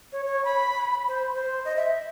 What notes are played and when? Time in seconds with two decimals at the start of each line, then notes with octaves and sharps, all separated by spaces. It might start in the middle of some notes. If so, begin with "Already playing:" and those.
0.12 C#5
0.26 C#5
0.45 B5
1.08 C5
1.33 C5
1.65 D#5
1.76 E5